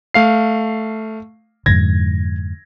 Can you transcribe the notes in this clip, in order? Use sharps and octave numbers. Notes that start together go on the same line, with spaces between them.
A3 F5 C7
F2 G#2 D3 G#6 A#6